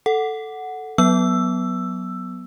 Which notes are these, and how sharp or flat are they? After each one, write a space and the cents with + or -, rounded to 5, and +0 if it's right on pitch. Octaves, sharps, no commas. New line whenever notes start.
A4 +0 F#5 +0
F#3 +0 B3 +0 E6 +10